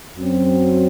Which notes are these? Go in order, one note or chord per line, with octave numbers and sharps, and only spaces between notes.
F#2 F#3 C4